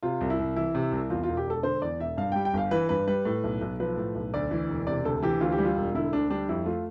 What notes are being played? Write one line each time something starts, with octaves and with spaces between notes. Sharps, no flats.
C3 F4
C2
E4
C2
E3 E4
C3
C2
E2 F4
F4
E1
G4
E1 A4
D3 C5
E2 D5
E1 E5
G2 F5
G3 G5
G5
G1 F5
E3 B4
G2 B4
G3 B4
A2
B1
B1
F3 B4
A2
B1
D2 D5
E3
E1
C3 D5
D2 A4
E3 G4
D2 F4
G4
G3
F4
E1
D3 E4
D2 D4
G3 D4
F2 E4
A3 F4